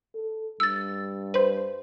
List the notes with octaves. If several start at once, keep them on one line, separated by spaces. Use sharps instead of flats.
A4
G2 E6 A6
B4 C5